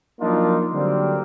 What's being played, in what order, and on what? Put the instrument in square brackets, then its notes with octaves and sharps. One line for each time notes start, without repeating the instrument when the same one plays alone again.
[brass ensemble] F3 F#3 A#3 D4 D#4 F4
D3 F#3 G3 A#3 C4